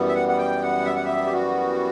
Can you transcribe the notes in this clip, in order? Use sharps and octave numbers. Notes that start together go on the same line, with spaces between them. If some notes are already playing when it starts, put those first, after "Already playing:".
Already playing: F#2 E3 G3 B3
E5
F#5
F#5
G5
F#5
E5
F#5
E5
G4
F#4